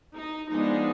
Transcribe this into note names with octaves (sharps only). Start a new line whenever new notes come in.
D#4
F3 G#3 B3 D4 D#4